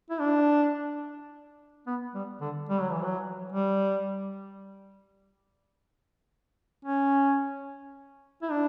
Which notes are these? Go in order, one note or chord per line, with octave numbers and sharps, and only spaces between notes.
E4
D4
B3
G3
D3
G3
F#3
E3
F#3
G3
C#4
E4
D4